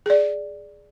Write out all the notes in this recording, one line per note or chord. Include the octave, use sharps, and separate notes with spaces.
G#4 D5